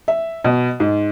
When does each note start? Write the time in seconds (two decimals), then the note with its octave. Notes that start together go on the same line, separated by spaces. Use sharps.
0.08 E5
0.44 B2
0.80 G#2